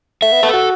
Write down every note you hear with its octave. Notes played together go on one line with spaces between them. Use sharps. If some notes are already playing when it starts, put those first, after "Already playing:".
A3 E5
B3
B3 A4
F#4